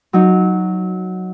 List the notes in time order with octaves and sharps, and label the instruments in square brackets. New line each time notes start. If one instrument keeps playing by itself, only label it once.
[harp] F#3 D#4